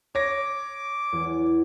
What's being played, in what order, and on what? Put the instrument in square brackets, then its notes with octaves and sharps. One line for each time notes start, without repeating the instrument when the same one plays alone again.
[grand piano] C#5 A#6 [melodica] D6
[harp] E2